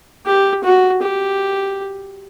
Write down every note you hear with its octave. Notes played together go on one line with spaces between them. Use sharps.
G4
F#4
G4